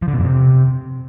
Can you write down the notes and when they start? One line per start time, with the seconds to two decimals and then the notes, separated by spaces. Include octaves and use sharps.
0.02 F3
0.08 D3
0.13 B2
0.19 F2
0.24 C3